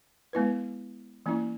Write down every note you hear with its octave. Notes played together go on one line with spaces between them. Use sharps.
G#3 B3 E4 B4
E3 A#3 C#4 E4